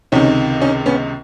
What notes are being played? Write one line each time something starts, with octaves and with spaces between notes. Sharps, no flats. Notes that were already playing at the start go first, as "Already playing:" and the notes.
C#2 C3 D#3 C#4 D#4
C#4 D#4
B3 C#4